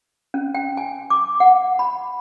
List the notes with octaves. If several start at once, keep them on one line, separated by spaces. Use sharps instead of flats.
C#4
G5
G#5
D6
F#5
B5